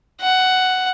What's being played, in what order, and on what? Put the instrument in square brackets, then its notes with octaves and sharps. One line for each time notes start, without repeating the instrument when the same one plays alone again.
[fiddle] F#5